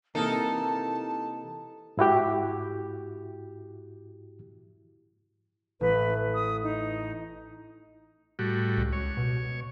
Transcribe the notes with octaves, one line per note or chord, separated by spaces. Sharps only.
C3 E3 A#3 D#4 A4 A#4 A5
G#2 E4 F#4 G4
A1 A3 B4
D#6
D#4
A2 G3 F#4
C#2
C#5
B2